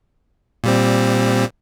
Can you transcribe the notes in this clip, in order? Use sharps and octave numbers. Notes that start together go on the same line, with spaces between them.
A#2 G3 C4